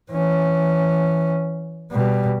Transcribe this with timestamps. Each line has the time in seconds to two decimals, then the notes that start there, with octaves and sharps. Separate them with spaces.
0.11 E3 C#4
1.92 B2 G3